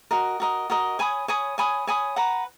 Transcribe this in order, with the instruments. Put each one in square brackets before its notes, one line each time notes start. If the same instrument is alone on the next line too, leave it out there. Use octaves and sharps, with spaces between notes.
[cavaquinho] F#4 A#4 D#5
F#4 A#4 D#5
F#4 A#4 D#5
C#5 G#5 B5 D#6
C#5 G#5 B5 D#6
C#5 G#5 B5 D#6
C#5 G#5 B5 D#6
B4 F#5 A#5